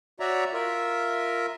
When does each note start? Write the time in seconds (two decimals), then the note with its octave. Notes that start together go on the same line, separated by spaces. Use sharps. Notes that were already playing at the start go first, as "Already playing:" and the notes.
0.20 F#4 C#5 D5 E5 A#5
0.53 F4 A#4 E5